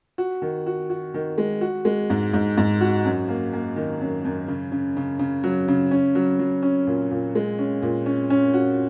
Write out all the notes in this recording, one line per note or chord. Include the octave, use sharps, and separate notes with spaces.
F#4
D#3
F#4
F#4
D#3
G#3
F#4
G#3
G#2
G#2
G#2
F#4
F#2
A#3
A#3
D#3
F#2
F#2
C#3
C#3
C#3
C#3
F#3
C#3
C#4
F#3
F#3
C#4
A#2
A#2
G#3
C#4
A#2
C#4
C#4
F#4